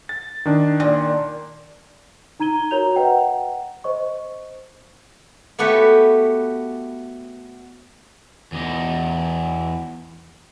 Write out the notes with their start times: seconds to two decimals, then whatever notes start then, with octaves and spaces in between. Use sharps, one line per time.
0.09 A6
0.45 D#3 D4
0.80 A#2
2.40 D#4 A#5 G#6 D#7 G7
2.71 F#4 A#4 C#5 A#5 G6 F7
2.96 B4 D#5 F#5 G5 A#5
3.84 C5 D#5 C#6
5.59 A3 B3 F#4 G4 B4
8.52 E2 D#4